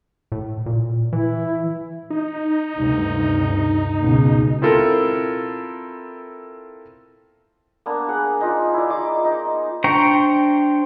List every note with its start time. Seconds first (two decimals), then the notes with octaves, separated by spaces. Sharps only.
0.32 A2
0.66 A#2
1.13 E3 E4
2.10 D#4
2.76 D2 G2 C3
4.00 C#2 B2
4.62 C4 E4 F4 A4 A#4
7.86 A#3 B3 D4
8.09 G#4 F#5
8.41 D#4 F4
8.74 E4 D5
8.90 D#4 F4 D#5 D6
9.25 D#4
9.84 D4 C5 G5 A#5 C#6